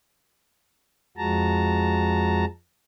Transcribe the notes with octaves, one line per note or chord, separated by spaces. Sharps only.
F2 F3 G#3 F#4 A5 A#5